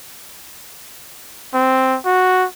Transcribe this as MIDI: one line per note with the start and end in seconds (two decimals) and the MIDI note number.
1.54 1.98 60
2.06 2.46 66